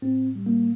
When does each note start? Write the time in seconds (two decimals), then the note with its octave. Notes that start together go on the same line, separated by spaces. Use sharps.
0.02 A2 C4
0.35 G3
0.46 A#3